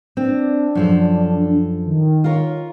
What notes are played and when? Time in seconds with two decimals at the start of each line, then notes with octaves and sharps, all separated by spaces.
0.17 C4 D4
0.75 F#2 F3 A4
1.85 D#3
2.24 F4 A#4 C#5